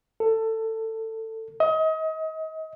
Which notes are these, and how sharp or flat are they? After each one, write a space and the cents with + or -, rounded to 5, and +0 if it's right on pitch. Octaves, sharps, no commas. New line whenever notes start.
A4 +20
D#5 +30